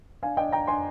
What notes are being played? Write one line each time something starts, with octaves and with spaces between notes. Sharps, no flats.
D4 F5 G#5
D4 D#5 G5
D4 G5 A#5
D4 G#5 C6